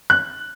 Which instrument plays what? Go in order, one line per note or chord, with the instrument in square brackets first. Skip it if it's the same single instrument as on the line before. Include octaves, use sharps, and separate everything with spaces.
[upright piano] F#6